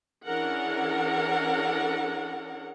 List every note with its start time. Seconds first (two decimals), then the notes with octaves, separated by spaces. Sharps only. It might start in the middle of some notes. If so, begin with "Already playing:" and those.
0.25 E3 C#4 D4 G#4 A#4 F#5